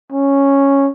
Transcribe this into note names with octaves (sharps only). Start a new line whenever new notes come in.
C#4